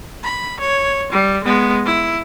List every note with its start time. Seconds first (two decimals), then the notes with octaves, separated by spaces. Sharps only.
0.24 B5
0.60 C#5
1.12 G3
1.44 G#3 B3
1.86 E4